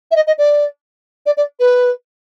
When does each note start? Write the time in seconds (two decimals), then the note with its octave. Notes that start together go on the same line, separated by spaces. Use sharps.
0.11 E5
0.16 D#5
0.27 D#5
0.38 D5
1.26 D5
1.37 D5
1.60 B4